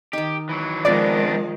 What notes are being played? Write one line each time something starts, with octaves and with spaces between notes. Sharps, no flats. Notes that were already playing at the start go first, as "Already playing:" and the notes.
D#3 D#4 G4
E3 F#3
D#3 F3 G#3 B3 C4 D4 B4 D5